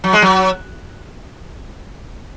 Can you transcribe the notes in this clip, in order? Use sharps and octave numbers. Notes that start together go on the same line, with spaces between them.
F#3
G#3
F#3